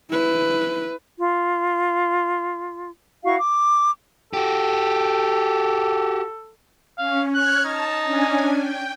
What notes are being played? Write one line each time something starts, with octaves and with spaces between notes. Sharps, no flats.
E4 B4
F4
E4 F#4 F5 C#6
D6
F#4 G4 A4
C#4 F5
C#5 F6 F#6 G#6
D#4 A5
C#4 D4 G#5
G5